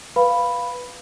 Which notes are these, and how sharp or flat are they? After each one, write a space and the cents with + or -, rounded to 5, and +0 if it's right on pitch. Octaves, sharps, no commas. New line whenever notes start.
B4 +0 F5 +0 B5 +0